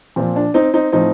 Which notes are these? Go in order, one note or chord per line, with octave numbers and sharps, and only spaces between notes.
A#2 F3 C4
D4
C4 D#4
C4 D#4
A2 F3 C4 D#4